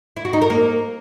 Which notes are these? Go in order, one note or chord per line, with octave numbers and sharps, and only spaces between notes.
E4
F#4
D#4
A#4
A#3